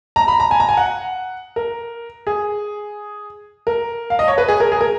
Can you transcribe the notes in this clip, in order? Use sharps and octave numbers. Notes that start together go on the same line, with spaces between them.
A#5
B5
A#5
G#5
A#5
G#5
F#5
A#4
G#4
A#4
F5
D#5
C#5
B4
G#4
A#4
G#4
A#4